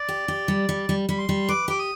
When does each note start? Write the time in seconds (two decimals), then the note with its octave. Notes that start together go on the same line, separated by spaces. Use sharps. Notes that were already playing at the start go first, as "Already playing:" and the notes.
Already playing: D5
0.09 G4
0.28 G4
0.48 G3
0.69 G3
0.89 G3
1.09 G3 B5
1.18 C6
1.29 G3
1.48 B4 D6
1.68 G4 D6
1.79 D#6